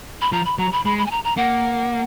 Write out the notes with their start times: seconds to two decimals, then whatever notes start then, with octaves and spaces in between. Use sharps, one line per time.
0.21 B5
0.32 F3 A#5
0.45 B5
0.59 F#3 A#5
0.72 B5
0.85 G#3 B5
0.98 B5
1.06 G#5
1.11 A#5
1.24 A#5
1.37 A#3 F#5